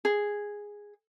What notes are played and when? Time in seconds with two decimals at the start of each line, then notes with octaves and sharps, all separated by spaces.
0.05 G#4